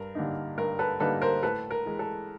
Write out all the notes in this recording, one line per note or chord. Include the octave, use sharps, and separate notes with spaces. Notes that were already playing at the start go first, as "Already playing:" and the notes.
Already playing: G2 A#4
D3 G3 A#3 D#4
G2 A#4
A4 B4
D3 G3 A#3 D#4 A4 B4
A#4 C5
A2 A4 B4
A#4
E3 G#3
A4